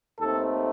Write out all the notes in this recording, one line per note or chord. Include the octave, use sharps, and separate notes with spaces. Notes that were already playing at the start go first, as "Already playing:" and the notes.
D#2 D#3 A3 C4 A4